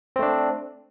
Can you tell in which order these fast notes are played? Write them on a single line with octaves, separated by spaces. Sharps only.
C4 A3 D4